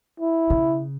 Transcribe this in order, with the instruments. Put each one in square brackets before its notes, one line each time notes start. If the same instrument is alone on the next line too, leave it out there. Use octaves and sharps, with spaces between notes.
[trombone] E4
[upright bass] C#3